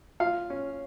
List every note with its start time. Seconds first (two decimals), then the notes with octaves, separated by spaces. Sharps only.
0.20 F4 F5
0.50 C#4